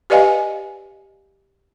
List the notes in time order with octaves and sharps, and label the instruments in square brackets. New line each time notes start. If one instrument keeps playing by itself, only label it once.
[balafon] G4 B4 D5 D#5 F5 G#5